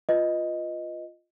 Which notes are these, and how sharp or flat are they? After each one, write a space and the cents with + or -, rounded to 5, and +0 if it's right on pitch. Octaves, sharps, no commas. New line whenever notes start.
F4 +0 B4 +0 D#5 +0